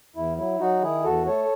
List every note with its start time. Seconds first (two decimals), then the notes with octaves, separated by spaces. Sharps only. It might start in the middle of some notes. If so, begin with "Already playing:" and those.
0.15 E2 E4
0.38 F#3 E4
0.60 F#3 D#4 F#4
0.82 D#3 E4 G#4
1.04 E2 F#4 A4
1.26 A3 A4 C#5